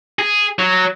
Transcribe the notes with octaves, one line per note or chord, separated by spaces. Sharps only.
G#4
F#3